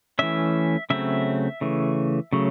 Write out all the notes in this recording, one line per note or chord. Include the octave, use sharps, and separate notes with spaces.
E3 A3 C#4 E5
C#3 F#3 A3 C4 E5
C#3 E3 A3
C#3 F#3 A3